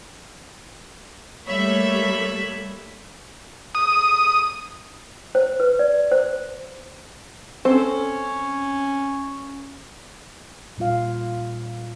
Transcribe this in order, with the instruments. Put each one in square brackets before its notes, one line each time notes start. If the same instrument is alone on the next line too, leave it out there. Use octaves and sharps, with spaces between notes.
[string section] G3 A3 A#3 [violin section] C#5 E5 B5
[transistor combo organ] D#6
[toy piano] C5
B4
D5
C5
[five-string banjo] C4 A4 C5 [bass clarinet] C#4
[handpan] A#2 G3 F4 F5